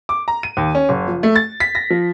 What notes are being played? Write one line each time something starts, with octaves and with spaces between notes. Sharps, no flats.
D6
A#5
D#7
D#2
C#4
F#1
F3
A3
A6
B6
A#6
F3